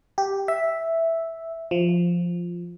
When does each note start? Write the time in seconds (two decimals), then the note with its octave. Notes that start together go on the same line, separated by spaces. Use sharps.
0.18 G4
0.48 E5
1.71 F3